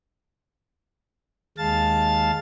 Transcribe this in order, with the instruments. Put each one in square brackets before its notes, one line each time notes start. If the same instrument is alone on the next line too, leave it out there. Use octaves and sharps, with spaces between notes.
[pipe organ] D#2 G#3 F5 A5 A6